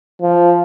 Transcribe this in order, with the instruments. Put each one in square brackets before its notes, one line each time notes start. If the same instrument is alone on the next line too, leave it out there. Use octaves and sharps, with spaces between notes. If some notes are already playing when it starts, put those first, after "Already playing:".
[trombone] F3